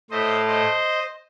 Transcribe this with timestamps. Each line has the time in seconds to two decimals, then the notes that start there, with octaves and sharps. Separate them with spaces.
0.11 A2 A3 C5 D#5
0.47 C5 D#5